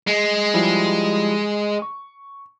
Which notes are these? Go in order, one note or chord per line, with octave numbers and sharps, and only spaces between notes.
G#3
F3 G3 E4
C#6